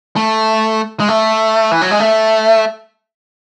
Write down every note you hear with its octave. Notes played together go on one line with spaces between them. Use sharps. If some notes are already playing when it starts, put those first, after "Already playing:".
A3
G#3
A3
E3
F#3
G#3
A3